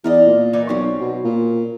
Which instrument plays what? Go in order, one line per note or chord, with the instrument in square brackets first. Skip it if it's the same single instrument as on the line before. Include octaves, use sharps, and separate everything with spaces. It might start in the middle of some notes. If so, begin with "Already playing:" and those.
[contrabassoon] E2 [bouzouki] A#4 D5 D#5
[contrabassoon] A#2
[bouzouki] E3 D#4 D5
[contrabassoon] B1 [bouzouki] C4 C#4
[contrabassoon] B2
A#2